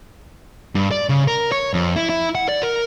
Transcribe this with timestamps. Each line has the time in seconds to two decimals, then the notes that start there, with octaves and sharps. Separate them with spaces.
0.75 G2
0.91 D5
1.09 C#3
1.28 A#4
1.52 C#5
1.74 F2
1.96 E4
2.09 E4
2.35 F#5
2.49 D5
2.63 A#4